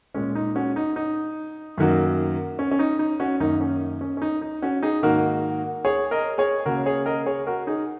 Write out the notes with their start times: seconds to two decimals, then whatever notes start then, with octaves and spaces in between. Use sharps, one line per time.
0.14 A#2 G#3 C#4
0.35 D#4
0.55 C#4 F#4
0.76 D#4
0.96 D#4
1.78 F#2 D#3 F#3 A#3
2.59 C#4
2.71 C#4
2.79 D#4
2.99 D#4
3.20 C#4 F#4
3.40 F#2 D#3 A#3 D#4
3.61 C#4
4.01 C#4
4.17 C#4
4.22 D#4
4.42 D#4
4.62 C#4 F#4
4.83 D#4 G#4
5.03 G#2 D#3 A#3 F#4 A#4
5.85 G#4 C#5
6.11 A#4 D#5
6.38 G#4 C#5
6.66 C#3 A#3 F#4 A#4
6.86 G#4 C#5
7.06 A#4 D#5
7.26 G#4 C#5
7.47 F#4 A#4
7.67 D#4 G#4